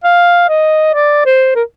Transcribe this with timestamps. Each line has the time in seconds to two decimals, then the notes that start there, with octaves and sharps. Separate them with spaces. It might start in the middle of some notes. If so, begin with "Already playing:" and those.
0.04 F5
0.49 D#5
0.94 D5
1.26 C5
1.55 A#4